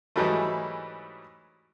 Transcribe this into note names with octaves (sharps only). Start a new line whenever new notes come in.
G#2 E3 F#3 G3 A3